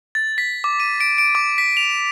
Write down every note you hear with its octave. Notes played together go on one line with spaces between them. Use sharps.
A6
B6
D6
D#7
D7
D7
D6
B6
F7